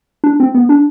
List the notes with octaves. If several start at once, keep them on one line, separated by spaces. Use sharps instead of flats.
D4
C4
B3
D4